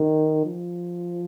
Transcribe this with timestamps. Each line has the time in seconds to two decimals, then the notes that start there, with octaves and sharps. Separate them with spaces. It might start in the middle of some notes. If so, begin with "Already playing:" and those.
Already playing: D#3
0.45 F3